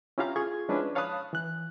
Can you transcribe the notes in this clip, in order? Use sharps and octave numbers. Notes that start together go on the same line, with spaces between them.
C#4 E4 F4 G4 F5 A#5
F4 G#4 C#6 G#6
F3 G#3 C#4 D4 E4 B4
C#5 F5 A5 B5 D#6 F#6
E3 F#6